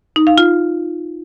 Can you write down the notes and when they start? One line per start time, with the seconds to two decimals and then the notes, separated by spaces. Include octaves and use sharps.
0.16 D#4
0.27 F5
0.38 F4